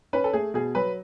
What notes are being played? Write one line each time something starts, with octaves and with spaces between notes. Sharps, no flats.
C#4 B4
A4
A3 G#4
B2 G#4
F#3 B4